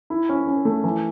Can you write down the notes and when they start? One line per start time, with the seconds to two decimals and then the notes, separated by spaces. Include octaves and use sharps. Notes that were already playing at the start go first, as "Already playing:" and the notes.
0.10 E4
0.29 C#4
0.47 C#4
0.65 A3
0.84 E3